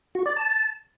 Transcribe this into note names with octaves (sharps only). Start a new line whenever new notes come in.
F#4
D5
A5